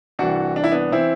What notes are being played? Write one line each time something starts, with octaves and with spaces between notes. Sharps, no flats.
C2 C3 E3 D4 F#4
D4
E4
B3 D4
E3 C4 E4